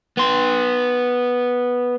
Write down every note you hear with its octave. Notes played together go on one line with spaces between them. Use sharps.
B3 C6